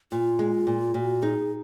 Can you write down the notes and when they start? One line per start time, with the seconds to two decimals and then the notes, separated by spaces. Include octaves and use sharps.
0.12 A#2 F4
0.39 G#3
0.67 A#2
0.94 A#2 F#4
1.22 D#4 G#4